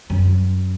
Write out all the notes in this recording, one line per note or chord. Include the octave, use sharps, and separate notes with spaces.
F#2